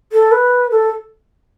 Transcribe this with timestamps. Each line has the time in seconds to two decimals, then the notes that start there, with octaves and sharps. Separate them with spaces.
0.12 A4
0.32 B4
0.71 A4